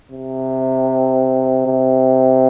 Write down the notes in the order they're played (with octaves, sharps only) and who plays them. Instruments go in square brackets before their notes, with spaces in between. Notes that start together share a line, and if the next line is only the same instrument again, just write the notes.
[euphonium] C3
C3